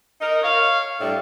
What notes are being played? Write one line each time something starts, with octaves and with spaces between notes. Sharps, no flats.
D#4 A#4
C#5 F5
A2 G3 D4